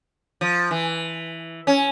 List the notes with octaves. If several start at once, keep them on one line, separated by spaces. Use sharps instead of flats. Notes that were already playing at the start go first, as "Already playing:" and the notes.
F3
E3
C#4